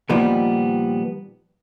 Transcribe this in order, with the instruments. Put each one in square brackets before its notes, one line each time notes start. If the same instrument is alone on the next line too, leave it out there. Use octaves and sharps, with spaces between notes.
[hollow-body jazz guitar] A#2 D#3 F3 G3 B3